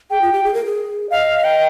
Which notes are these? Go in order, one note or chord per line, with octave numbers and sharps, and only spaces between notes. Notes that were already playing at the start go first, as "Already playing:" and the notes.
G#4 G5
F4
G4
G#4
A#4
G#4
D#5 F5
G5